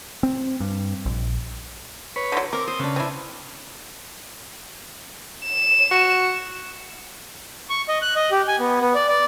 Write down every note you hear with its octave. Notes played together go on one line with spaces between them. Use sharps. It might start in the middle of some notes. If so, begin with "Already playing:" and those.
C4
G2
A#1
B4 C#5
D3 F#3
C4 A#4 D6
C5 D#6
C#3 D4 B4
C4 E4 G#5
E7
F#4
C#6
D#5
F#6
D#5
G4
G#5
B3
B3
D5
D5